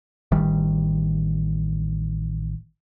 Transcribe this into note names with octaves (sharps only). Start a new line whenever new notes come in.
A1 D#3 G3